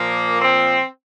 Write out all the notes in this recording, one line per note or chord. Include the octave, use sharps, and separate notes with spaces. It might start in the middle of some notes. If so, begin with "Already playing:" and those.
Already playing: A#2 F3 A#3
C4